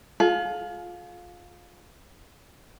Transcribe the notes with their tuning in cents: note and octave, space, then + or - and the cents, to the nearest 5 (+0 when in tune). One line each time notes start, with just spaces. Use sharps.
F4 +20 G#4 +45